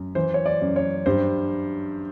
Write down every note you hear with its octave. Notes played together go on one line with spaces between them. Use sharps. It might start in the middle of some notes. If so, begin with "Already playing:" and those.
Already playing: F#2
E3 C5
C#5
D5
F#2
C#5
G2 C5